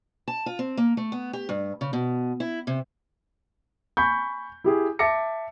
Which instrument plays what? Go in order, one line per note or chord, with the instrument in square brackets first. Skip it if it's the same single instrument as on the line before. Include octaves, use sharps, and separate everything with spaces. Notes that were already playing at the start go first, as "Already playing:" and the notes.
[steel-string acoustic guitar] A5
F4
C4
A#3
A3
B3
G4
G2
C#3
B2
E4
C3
[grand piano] G#5 B5 C#6 G6
E4 G4 G#4
E5 A5 D6 A6 A#6 C#7